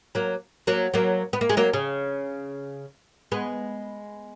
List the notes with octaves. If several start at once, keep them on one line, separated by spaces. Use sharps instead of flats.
F#3 A#3
F#3 A#3
F#3 A#3
B3
A#3
G#3
F#3 A#3
C#3
G#3 B3